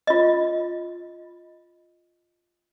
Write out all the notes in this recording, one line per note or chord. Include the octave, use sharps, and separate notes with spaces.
F4 D#5